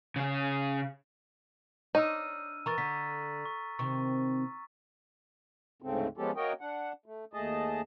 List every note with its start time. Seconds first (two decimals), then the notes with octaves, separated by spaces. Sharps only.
0.16 C#3 C#4
1.95 D4 D#4 C#5 E6 F6 D#7
2.66 E3 A#4 A#5 C#6 A6
2.78 D3 B6
3.45 C#6
3.79 C3 D#3 C#6
5.82 D2 G#2 C#3 A3 C4
6.17 F3 G#3 B3 C#4 G4 A4
6.36 A#3 F#4 A#4 C#5 D#5 G5
6.61 D4 F#5
7.06 A3
7.33 D#2 A3 G#4 D#5 A5